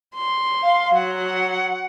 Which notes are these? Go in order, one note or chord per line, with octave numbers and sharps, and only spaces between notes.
C6
F5
F#3 F#5